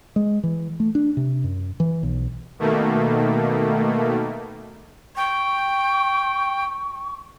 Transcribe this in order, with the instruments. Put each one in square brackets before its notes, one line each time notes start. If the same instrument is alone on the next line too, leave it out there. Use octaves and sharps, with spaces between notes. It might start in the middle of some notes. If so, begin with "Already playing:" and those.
[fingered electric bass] G#3
E3
A3
D4
C3
F#2
E3
B1
[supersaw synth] B2 D#3 A3 A#3
[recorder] G5 [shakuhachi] C#6